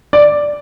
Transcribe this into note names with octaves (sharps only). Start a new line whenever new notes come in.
D5